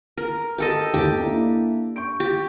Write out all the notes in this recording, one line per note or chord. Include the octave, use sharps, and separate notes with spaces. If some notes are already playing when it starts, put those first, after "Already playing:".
A#4
G4 A4 A#4 D#5
D#2 G4
A#3 D4 E4
C#6 G6 D7
G4